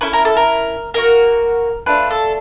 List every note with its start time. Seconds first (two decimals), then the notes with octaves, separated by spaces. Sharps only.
0.01 C#4 E4 A4 B4
0.13 A#4
0.25 A4
0.37 A#4
0.94 A#3 D#4 F#4 A#4
1.86 A3 D4 F4 B4
2.11 A4